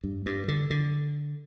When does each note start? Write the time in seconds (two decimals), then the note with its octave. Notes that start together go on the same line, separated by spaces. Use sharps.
0.04 G2
0.26 G2
0.48 D3
0.70 D3